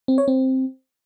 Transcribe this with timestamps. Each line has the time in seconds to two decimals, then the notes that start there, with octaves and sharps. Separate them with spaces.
0.08 C4
0.18 C#5
0.28 C4